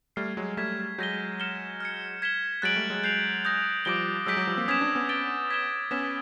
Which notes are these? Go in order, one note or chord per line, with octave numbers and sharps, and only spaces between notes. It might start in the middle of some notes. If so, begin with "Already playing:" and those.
G3 A3 F6 G#6 C7
F#3 G#3
G3 A3 G#6 B6 E7
F#3 G#3 G6 A#6 D#7 G7
F6 A#6 C#7 E7 G7
F6 G#6 C#7
G#6 B6 E7 G7
F#3 G#3 F#6 A6 D7 F#7
G3 A3
F#3 G#3
G6 C7 F7
D#6 G6 A#6
F3 G3 D6 G6 A#6 D7 G7
F#3 G#3 E6 G6 B6 D7
F#3
F3 G3
A#3 C4
B3 C#4 D#6 G#6 B6 E7
C4 D4
B3 C#4
A6 D7 G7
G#6 B6 E7 G7
B3 C#4 E6 G#6 B6 E7